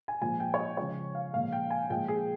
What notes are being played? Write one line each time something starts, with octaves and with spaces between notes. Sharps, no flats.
G#5
A#2 F3 G#3 G#5
G5
C#5
D#5
C#3 F3 G#3 C#5
F5
A#2 F3 G#3 F5
G5
G#5
A#2 F3 G#3 G5
G#4